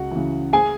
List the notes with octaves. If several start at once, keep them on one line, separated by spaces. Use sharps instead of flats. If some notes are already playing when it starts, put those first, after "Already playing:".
Already playing: C#2 F#4 F#5
C#3 E3
G#4 G#5